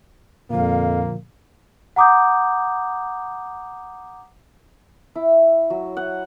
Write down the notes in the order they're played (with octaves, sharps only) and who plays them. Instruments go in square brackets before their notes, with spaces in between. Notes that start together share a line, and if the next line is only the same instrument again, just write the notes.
[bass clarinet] F2 [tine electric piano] A#2 D3 F3 [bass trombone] A#3 [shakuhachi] F5
[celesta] F#5 A#5 D6 D#6 G6
[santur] E4
F#3
F#5